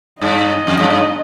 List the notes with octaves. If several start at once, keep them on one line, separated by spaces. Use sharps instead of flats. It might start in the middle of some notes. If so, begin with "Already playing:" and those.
G2 D#5
F2
G2
G2